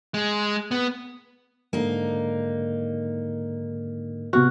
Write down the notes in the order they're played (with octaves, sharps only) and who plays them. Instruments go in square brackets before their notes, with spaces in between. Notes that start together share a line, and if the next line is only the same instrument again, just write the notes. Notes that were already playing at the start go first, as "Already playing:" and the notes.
[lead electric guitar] G#3
B3
[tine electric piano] G#2 D3 [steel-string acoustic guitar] A#3 D#4
[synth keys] C3 B3 F6 [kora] F#4